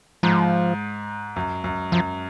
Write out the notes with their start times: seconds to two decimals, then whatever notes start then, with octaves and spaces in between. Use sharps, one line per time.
0.23 G#2 F3
1.36 F#2
1.64 F#2
1.92 F#2 F3